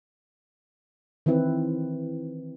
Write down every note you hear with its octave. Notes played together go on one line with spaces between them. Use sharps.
D#3 E3 C4 E4 B4